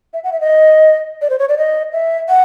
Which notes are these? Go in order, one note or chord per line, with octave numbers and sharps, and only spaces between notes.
E5
F#5
E5
D#5
D5
C5
C#5
D5
D#5
E5
F#5